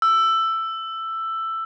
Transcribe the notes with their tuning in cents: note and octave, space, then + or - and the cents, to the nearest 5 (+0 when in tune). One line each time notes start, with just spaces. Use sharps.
E6 +10